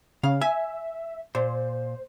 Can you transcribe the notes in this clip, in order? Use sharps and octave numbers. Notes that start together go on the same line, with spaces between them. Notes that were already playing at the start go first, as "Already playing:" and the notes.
C#3 F5
E5 G#5
A#2 C5